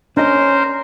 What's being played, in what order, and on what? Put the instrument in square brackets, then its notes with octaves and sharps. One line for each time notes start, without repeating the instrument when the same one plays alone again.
[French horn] C#4 [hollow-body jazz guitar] D4 D#5 [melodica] A#4 C5